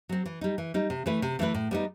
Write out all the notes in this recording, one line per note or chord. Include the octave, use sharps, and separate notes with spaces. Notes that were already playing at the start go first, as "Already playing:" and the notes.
F#3 C4
E3
G3 D#4
E3
G3 D#4
C3
E3 A3 E4 B4
C3
E3 A3 E4 B4
A2
G3 B3 D#4